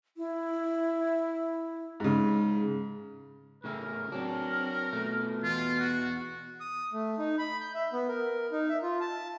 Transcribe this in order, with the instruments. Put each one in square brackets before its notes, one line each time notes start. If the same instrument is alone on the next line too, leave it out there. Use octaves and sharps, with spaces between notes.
[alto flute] E4
[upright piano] G#2 C#3
[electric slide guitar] A2 C#3 E5 [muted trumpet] A#4
[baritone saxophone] F#3 [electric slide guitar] C4 D4
[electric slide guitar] B2 A3
[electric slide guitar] E2 [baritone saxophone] B2 [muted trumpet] F4
[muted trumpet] F#4
[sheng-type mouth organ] D#6
A3
D#4
B5
G6
E5
B3
A#4
D#4
E5
F4
A5